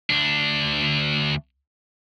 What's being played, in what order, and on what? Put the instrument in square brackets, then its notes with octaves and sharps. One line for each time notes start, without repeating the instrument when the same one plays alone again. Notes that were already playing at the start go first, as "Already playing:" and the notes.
[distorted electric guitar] D2 D4